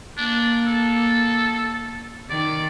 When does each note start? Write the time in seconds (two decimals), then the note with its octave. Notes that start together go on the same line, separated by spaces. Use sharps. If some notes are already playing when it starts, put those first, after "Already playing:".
0.17 A#3 D4
0.67 A4
2.30 D#3 D5